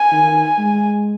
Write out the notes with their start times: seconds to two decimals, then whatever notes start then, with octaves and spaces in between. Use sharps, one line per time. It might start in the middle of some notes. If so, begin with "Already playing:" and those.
Already playing: G#5
0.12 D#3
0.59 G#3